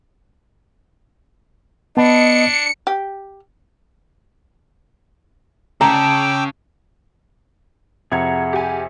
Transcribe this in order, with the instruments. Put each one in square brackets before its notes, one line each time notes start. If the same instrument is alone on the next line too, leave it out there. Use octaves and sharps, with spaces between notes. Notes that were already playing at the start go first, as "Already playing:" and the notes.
[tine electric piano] B3 A5 B5 [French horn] D4 [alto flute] D#5 [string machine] C#7
[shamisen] G4
[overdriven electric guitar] C#3 [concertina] G5 D6 E6 [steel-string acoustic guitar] A5 [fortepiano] A#5
[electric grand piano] F2 C3 G#6 [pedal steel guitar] G#4 F#5 A#5 [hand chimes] E5 C#7
[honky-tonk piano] G4 G#5